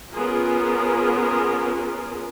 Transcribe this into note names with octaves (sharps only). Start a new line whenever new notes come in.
B3 C#4 F4 G#4 A#4